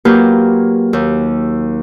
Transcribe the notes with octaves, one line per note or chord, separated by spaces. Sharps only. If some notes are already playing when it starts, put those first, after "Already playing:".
F#3 A#3 F4 G4 B4
D#2